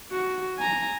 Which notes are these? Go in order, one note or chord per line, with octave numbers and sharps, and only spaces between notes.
F#4
G#5 A#5